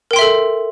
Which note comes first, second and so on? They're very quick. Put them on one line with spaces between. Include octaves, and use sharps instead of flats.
A#4 G5 C6 E5 A4